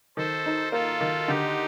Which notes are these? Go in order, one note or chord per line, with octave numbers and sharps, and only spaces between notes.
D#3 A4 C5
D#4
A#3 F4 A4
D#3
D3 D#4 G4